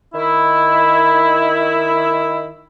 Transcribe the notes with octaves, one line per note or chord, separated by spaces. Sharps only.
D#3 E4